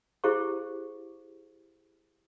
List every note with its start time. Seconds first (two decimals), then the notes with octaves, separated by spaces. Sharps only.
0.24 E4 G4 G#4 C5 F5 C#6